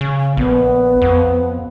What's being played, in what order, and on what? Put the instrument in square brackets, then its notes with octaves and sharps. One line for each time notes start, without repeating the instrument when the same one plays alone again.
[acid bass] C#3
[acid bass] A#1 [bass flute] B3
[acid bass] F2